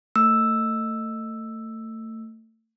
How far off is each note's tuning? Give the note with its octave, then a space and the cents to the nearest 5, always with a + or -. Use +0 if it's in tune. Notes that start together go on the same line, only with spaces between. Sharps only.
A3 +30 E6 +0